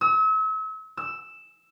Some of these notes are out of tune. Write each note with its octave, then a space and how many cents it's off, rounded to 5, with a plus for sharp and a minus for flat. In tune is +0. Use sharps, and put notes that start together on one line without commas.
E6 -40
E6 +5